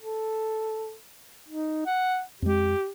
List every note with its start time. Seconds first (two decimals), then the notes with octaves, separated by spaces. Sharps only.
0.01 A4
1.48 D#4
1.86 F#5
2.42 F2 G#3 G4